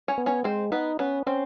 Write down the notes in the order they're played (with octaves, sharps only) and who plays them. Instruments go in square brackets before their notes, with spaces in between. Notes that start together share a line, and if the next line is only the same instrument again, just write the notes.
[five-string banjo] C#4 C#5
[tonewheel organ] B3
[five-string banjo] C#4 C#5
[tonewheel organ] G#3 [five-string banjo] C4 C5
[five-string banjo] B3 B4 [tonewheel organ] D#4
[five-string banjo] B3 B4 [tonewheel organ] C#4
[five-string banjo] C4 C5 [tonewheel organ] C#4